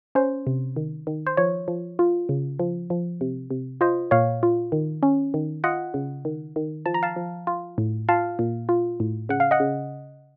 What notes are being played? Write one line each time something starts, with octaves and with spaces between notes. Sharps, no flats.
C#4 C5
C3
D#3
D#3
C5
F3 C#5
F3
F4
C#3
F3
F3
C3
C3
F4 C5 D#5
A#2 C#5 F5
F4
D#3
C#4
D#3
F4 D#5 F#5
C#3
D#3
D#3
F3 A5
A#5
F5 A5
F3
F4
A2
F4 F5 A5
A#2
F4
A2
C#3 F#5
F5
D#5 F#5
C#3